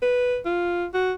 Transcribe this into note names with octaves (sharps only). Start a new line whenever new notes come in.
B4
F4
F#4